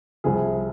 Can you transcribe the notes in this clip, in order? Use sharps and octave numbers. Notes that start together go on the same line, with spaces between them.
C2 C3 F3 G#4 G#5